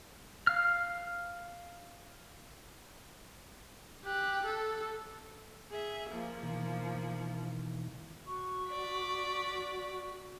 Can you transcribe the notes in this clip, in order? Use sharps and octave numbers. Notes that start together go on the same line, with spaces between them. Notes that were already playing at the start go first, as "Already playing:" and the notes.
F5 F6
G4 F#6
A4
G#4 E5
F3 A#3
B2 D#3 E3
F#4 C#6
D5 B6